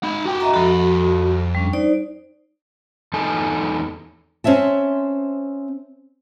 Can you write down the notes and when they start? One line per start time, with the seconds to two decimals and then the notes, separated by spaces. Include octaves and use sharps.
0.04 D#4 B5
0.26 F#4 G5
0.40 D#5 E5 A#5
0.54 F2 F#4 A4 B5
1.55 G3 C#4 D4
1.73 D#4 C5 D5
3.13 E2 D#4 A4 G#5
4.44 C4 C#4 C5 E5 A5